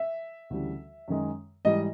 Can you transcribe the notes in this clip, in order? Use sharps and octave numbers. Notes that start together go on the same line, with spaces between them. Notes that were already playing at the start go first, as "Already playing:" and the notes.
Already playing: E5
D2 C#3 E3 G3
F#2 D#3 G#3
G#2 E3 G3 D#5